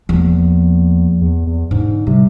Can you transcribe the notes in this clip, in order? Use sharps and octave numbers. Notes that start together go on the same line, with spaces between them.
E2 F3 A#3
E2
E2
G#2 D3
C3 G3